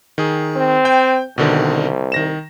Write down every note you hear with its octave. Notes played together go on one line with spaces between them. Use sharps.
D#3 G#4
C4
G5 G6
C2 B2 D3 D#3
D#3 A#6 E7